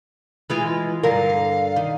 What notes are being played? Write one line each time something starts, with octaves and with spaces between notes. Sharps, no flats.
E3 G#3 F4
G2 D3 A#4 F5
D#3